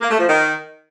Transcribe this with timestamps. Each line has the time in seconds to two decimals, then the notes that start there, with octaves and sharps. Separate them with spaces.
0.01 A#3
0.10 A3
0.19 F3
0.28 D#3